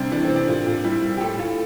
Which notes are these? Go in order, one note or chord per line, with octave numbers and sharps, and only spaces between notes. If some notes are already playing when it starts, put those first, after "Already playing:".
Already playing: C3 G3 D4
E3 D4
C4
C3
D4
A#2
A#2
G3 E4
G3
G4
A2 A4
A2 F4